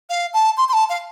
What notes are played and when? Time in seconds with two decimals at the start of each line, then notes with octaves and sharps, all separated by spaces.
0.10 F5
0.34 A5
0.57 C6
0.69 C6
0.73 A5
0.89 F5